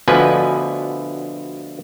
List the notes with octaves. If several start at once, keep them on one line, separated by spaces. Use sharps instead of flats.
D2 B2 D3 F3 B4 G#5